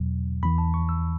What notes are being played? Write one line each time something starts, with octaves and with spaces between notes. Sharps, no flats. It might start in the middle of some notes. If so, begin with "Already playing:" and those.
Already playing: E2 B2 F#3
E2 E3 B5
A5
C#6
E6